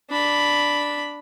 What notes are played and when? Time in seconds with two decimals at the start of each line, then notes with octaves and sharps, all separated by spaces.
0.10 D4 B5